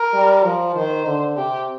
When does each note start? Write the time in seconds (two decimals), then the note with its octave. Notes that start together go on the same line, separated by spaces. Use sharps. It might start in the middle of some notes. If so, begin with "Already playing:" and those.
Already playing: A#4
0.14 G3
0.45 F3
0.75 D#3 C5
1.06 D3
1.37 C3 G4